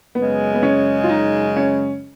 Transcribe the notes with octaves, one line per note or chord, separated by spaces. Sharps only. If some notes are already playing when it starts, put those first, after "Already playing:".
F#2 C#3 G#3 B3
B3
C#4
F4
D#4
C#4